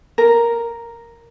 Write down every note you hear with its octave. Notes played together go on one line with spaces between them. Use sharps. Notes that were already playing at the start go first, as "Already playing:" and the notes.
A#4